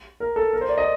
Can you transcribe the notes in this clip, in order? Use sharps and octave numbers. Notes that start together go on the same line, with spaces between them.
A#4
A4
A#4
C5
D5
D#5